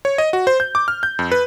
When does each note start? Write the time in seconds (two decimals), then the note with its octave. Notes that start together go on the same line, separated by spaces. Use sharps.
0.05 C#5
0.18 D#5
0.33 F#4
0.47 C5
0.60 G6
0.75 D6
0.88 F6
1.03 G6
1.19 F2
1.32 B4